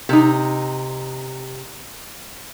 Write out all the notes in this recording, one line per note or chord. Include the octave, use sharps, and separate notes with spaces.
C3 D#4